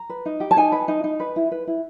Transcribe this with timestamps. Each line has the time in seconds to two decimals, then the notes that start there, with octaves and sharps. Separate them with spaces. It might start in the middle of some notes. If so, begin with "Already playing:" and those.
Already playing: A#5
0.09 B4
0.26 D#4
0.40 G4
0.51 A5
0.57 D#4 G#5
0.72 B4
0.88 D#4
1.04 D#4
1.20 B4
1.36 E4
1.52 B4
1.67 E4